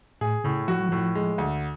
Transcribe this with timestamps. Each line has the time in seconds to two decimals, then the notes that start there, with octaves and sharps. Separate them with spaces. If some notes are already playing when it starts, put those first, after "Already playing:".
0.21 A2 G#4
0.44 A2 C#3
0.68 F3 F#4
0.79 F#3
0.89 A2 F3
1.15 G#3
1.38 D2